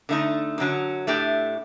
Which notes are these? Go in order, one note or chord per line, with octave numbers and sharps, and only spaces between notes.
D3 A3 D#4
F#2 D3 F#3
A2 A3 D4 G4